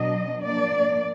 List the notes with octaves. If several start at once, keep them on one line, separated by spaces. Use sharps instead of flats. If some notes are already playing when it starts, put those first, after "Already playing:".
Already playing: B2 F#3 D4 D#5
F3 A#3 D4 D5